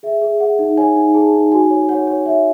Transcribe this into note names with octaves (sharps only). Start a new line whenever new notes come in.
G#4 E5
G#4
G#4 F#5
D#4
C#5 G#5
D#4
G#4 A5
D#4
F#4 G#5
C#5
C#5 F#5
C#5
C#5 E5